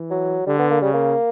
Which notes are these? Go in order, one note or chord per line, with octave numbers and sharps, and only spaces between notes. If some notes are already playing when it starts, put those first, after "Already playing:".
Already playing: E3
F#3
D3 G3
B3
A#3
C#3 G3
A#3